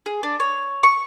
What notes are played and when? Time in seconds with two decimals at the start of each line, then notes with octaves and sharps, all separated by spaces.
0.06 G#4
0.23 D4
0.40 C#5
0.83 C#6